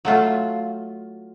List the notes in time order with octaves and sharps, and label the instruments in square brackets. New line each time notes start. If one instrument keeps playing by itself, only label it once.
[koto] F#3 A3 F4